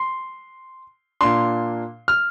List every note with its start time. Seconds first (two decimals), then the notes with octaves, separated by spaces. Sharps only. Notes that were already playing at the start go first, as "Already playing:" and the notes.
Already playing: C6
1.21 A#2 A#3 D4 C6
2.08 F6